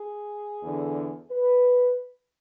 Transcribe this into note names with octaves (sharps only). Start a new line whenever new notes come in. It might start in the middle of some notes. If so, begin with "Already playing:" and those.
Already playing: G#4
E2 D3
B4